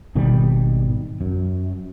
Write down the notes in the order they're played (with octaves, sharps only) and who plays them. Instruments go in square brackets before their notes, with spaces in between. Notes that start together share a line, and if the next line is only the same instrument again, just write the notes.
[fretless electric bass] G#1 B2 D#3 G3
F#2